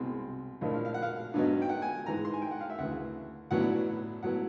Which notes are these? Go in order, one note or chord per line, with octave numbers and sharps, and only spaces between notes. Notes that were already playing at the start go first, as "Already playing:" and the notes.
Already playing: C2 B2 G#3 C4
A#1 A2 F3 A#3 D4 D#5
F5
F5
F#5
F5
G2 D3 F#3 B3 D#4
G5
F#5
G#5
G#2 E3 G#3 A#5
C6
G#5
G5
F#5
F5
E5
D2 C#3 E3 F#5
A1 A2 F#3 B3 D4 F#5
A2 F#3 B3 F#5